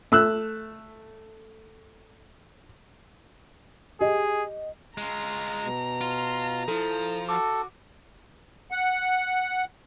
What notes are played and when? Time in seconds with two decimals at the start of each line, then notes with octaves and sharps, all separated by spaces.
0.12 A3 E6 F#6
4.01 G4 G#4 D#5
4.97 G#3 F4 A#5
5.64 B2
6.01 F4
6.68 F3 E4 A4
7.29 F#4 A4 D6
8.71 F#5